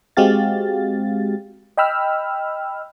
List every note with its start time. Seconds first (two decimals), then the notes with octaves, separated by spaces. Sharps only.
0.17 G#3 C4 F#4 G4 F5 A6
1.77 D#5 G5 B5 E6 F6